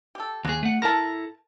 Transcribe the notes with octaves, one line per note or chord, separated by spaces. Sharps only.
G4 A4
D#2 F#3 G#4
A3 F#5
E4 A4 A#4 A5 A#5